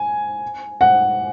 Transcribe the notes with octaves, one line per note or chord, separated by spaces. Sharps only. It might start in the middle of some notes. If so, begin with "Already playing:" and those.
Already playing: G#5
F#5